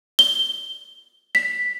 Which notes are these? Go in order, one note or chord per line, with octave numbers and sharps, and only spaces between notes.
G7
B6